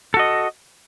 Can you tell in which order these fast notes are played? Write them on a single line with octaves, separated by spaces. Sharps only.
A4 F#4 D#5